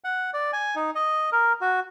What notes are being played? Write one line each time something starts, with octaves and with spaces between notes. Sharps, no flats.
F#5
D5
G#5
D#4
D#5
A#4
F#4